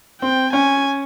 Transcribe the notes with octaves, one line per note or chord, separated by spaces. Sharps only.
C4 G5
C#4 G#5